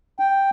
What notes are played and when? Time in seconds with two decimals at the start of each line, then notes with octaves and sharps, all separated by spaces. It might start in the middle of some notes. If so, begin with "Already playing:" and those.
0.19 G5